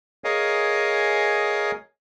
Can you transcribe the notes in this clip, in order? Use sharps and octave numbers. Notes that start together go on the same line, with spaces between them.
G#4 A#4 C#5 D#5 F5 G#5